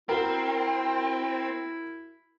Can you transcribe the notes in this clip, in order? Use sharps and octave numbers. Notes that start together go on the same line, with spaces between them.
C4 E4 F#4 A#4